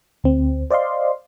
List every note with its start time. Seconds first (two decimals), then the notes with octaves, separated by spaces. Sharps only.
0.24 D2 C4
0.71 C5 D5 D#5 F5 C6